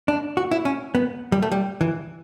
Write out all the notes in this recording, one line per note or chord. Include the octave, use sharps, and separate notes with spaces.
D4
F#4
E4
C#4
B3
G3
A3
G3
E3